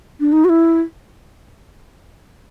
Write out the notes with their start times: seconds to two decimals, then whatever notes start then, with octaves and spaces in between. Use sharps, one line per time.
0.20 D4
0.32 D#4
0.45 F#4
0.49 E4